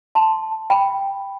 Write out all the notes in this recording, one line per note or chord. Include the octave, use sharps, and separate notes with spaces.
A5 C6
G5 B5